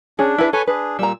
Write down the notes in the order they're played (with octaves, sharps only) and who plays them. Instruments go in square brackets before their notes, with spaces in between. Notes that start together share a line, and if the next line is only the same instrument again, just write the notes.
[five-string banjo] C#4 G#4 [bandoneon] D4
[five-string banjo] E4 G#4 B4
[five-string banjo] A4 [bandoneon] B4 C#5 G#5
[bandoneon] D4 G#4 [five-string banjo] B4
[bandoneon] A#2 E6 [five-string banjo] G3 A#5